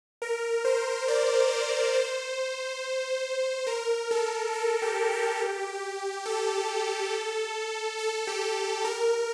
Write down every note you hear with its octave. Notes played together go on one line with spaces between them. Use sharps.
A#4
C5
D5
C5
C5
A#4
A4
A4
G4
G4
A4
A4
G4
A#4